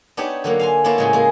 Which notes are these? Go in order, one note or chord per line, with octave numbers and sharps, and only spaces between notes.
B3 D4 D#4 G4 C#5
D3 F#3 A#3
F5 G#5 C6
A#3 B3 D4 E4 F4 C#5
A2 C#3 G#3
G#3 A#3 G#4